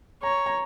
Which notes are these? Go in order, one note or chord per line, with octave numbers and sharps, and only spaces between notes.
C#5 A#5
A#5